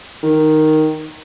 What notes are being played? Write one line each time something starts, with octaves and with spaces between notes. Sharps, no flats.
D#3